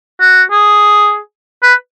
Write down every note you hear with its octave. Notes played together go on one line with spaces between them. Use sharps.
F#4
G#4
B4